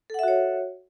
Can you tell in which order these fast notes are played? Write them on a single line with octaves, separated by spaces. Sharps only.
A4 F#5 E5 F#4 C#5